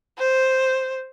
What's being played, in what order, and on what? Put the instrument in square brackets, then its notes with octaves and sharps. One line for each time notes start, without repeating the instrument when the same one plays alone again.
[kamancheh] C5